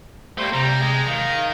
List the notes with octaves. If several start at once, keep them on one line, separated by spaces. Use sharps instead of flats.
G3 A3 A#3 C5
C3 G3 A#5
G#3
D#3 F5